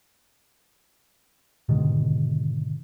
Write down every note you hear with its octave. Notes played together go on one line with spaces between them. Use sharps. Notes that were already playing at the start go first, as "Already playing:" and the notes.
G#2 B2 D3 D#3